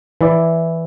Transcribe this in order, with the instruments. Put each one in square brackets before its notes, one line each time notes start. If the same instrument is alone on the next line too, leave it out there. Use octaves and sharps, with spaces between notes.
[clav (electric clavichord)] E3 E4 D5